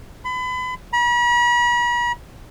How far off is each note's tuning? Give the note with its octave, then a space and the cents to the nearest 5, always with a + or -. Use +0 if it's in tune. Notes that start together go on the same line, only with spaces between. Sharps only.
B5 +35
B5 -45